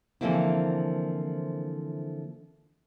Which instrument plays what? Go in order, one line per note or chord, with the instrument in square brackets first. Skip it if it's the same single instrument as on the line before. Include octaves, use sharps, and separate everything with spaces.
[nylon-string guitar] D3 E3 F3 A#3 C4 E4